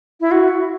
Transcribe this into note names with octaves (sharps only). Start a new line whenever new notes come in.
E4
F#4